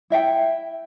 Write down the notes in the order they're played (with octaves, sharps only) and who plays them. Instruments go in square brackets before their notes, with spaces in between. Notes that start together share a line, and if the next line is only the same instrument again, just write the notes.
[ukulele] E4 E5 G5